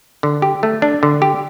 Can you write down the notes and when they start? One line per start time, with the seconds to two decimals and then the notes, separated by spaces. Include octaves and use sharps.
0.23 D3
0.42 G4
0.63 A3
0.82 D4
1.03 D3
1.22 G4